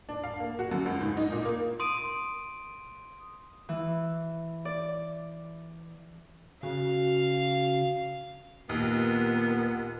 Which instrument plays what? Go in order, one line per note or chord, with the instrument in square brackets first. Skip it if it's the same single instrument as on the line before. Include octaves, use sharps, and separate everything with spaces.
[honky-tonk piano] D4
F5
A#3
F#4
F#2
C#2
G#2
D#4
A#2
A#3
[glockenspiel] C6 D#6 D7 D#7
[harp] E3
D5
[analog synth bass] C#3 [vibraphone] F#4 [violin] F5
[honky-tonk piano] D#2 [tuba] A#2 [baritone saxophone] B3 [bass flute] A#4